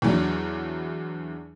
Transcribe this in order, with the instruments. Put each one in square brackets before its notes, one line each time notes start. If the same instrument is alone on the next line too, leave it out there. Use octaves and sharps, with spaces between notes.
[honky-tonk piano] E2 E3 F#3 D4